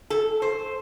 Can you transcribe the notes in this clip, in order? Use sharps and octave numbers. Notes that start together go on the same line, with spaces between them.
A4
C5